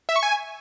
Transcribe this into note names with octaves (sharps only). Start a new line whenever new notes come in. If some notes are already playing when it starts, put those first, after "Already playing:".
E5
C#6
G#5